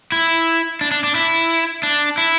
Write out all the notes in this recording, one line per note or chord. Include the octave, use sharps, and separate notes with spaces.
E4
D4
D4
D4
E4
D4
E4